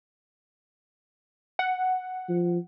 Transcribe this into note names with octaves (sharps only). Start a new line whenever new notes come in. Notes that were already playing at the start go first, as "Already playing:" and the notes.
F#5
F3